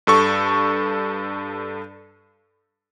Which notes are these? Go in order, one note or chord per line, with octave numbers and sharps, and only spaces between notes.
G2 A4 C#6